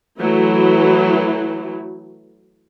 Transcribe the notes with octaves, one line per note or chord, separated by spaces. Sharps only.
E3 F#3 A3 E4